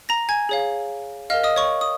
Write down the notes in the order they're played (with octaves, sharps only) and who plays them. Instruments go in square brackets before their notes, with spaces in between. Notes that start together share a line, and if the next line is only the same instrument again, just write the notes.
[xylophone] A#5 A#6
G#5 G#6
G#4 C#5 F5
A#4 D#5 F5 F6
D#5 D#6
C#5 C#6
D#6